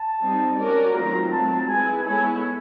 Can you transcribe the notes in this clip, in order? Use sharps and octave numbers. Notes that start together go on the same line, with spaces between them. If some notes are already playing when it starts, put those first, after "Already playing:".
Already playing: A5
G3 C4 D#4
C#4 F#4 A#4 D5
D#3 F#3 A3 C4 F4 A#5
F#3 A3 C4 A5
G#3 C4 E4 G#4 B4 G#5
G#3 B3 E4 A4 C#5 G#5